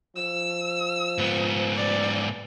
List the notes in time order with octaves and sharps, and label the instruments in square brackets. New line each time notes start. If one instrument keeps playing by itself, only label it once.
[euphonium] F3 [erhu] E6
[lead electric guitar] G#2 B3
[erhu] D5